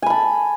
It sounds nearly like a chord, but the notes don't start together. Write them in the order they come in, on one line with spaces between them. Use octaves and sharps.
G#5 B5 A5